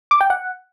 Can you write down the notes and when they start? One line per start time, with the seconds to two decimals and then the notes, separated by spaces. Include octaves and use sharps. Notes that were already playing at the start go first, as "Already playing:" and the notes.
0.11 D6
0.21 G5
0.30 F#5